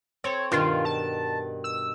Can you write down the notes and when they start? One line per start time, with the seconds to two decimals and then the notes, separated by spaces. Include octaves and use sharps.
0.24 C4 A4 C#5
0.52 G2 B2 D#3 F4
0.85 A5
1.64 E6